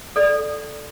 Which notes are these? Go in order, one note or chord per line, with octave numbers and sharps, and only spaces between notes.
A4 D5